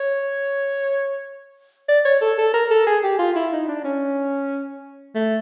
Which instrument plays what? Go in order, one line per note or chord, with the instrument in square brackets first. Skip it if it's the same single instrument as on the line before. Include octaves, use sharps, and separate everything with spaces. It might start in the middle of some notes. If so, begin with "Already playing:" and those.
Already playing: [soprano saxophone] C#5
D5
C#5
A4
A4
A#4
A4
G#4
G4
F4
E4
D#4
D4
C#4
A3